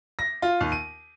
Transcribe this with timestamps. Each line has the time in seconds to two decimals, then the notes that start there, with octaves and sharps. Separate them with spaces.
0.19 A#6
0.42 F4
0.61 D#2
0.72 D#7